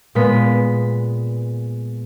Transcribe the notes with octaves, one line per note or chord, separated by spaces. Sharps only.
A#2 G#3 B3 B6